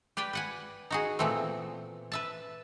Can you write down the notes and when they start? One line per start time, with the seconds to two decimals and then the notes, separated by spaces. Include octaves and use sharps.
0.17 G4 B4 D5 G5
0.33 B4 F#5 G#5
0.90 D#4 F#4 G#4
1.19 A#2 E3 A3 B3 C4
2.12 B4 E5 A5